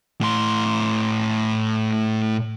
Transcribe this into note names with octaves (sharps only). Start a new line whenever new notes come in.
A2 C6